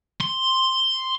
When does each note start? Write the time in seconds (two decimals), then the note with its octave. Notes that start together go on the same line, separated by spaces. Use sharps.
0.21 C6